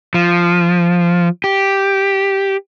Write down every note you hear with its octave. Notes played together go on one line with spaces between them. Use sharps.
F3
G4